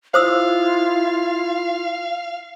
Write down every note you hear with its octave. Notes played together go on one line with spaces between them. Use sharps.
E4 F4 C5 F5 D#6 E6